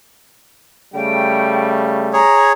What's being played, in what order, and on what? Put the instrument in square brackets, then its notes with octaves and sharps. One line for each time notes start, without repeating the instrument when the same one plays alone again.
[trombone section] C#3 G3 A3 [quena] G5
[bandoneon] G#4 C#5 [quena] A#5